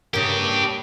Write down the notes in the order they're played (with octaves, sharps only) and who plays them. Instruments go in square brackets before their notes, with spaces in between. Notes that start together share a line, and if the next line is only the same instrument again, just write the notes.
[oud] C#3 A#3 [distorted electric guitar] D4 G4